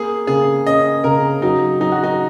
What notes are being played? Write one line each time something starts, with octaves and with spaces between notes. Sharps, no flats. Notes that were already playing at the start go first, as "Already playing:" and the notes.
Already playing: A#3 G#4
C#3 G#4
C#4 D#5
C#3 A#4
F#3 D#4
F#3 D#4
F#4
D#4